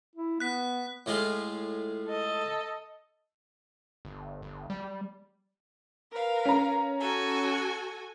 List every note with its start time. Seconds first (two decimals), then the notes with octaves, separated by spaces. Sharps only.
0.15 E4
0.40 B3 F#6 B6
1.06 A2 G#3 F4
2.09 A4 D#5
4.05 G1
4.42 G1
4.70 G3
6.11 A#4 B4 F5
6.45 C#4 A#5
6.99 F#4 A4 G#5